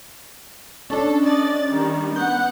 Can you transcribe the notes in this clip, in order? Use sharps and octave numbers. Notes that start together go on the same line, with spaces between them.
C#4 D4 A4
D5 D#5 A6
D#3 G3
B3 F#5 G6